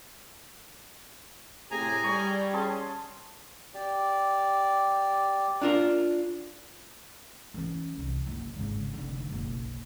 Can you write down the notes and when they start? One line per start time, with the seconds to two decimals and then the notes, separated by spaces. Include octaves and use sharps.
1.71 A2 C3 G4 G#4 G#5 A#5
2.04 G3 C#5
2.53 C#4 G#4 A5 C6
3.74 G4 D5
5.62 D4 F4 A#4
7.54 E3 C#4
7.97 C2
8.27 F#1
8.56 G#1 C#3
8.93 F1 D3
9.29 F#1 B1